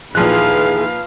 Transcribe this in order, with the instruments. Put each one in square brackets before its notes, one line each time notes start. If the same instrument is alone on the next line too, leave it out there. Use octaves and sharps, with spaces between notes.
[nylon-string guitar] D#2 E3 [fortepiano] A#2 F3 F#6 [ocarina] G#4 [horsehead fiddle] B4 F5